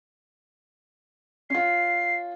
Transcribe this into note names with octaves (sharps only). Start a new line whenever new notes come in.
C#4 F4 C7